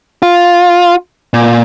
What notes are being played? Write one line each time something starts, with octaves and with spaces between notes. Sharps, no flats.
F4
A#2